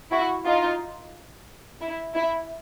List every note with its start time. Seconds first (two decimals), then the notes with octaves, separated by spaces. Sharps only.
0.12 E4 F#4
0.45 D#4 F4
1.81 E4
2.15 E4